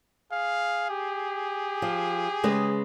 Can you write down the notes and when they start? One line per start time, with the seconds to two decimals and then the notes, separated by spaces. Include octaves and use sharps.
0.32 G#4 F5
0.90 G4
1.82 F3
2.43 C#3 G#3 B4